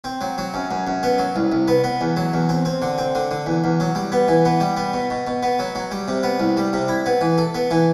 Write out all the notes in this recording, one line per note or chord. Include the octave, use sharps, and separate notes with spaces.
C4
F#3
F#3
F#2
F#2
F#2
B3
F#3
C2
C2
B3
B3
E2
F#3
E2
C4
C4
D3
C4
D3
D3
E2
E2
F#3
G3
B3
E3
B3
G3
B3
B2
B2
B2
B3
F#3
F#3
G3
C3
B3
C2
G3
C3
E4
B3
E3
A4
B3
E3